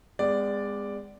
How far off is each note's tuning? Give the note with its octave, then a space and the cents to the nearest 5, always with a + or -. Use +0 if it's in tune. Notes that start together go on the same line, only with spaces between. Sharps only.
G#3 -25 B3 +35 D5 +0